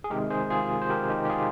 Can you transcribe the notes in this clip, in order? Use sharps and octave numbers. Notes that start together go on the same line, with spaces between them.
G#4
C3 D#3 G#3 G4 A#4
G#4 C5
F4 G#4
C5
G4 A#4
D#4 G4
G4
F4 G#4